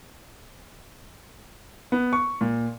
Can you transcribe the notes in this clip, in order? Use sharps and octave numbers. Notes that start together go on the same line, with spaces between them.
B3
C#6
A#2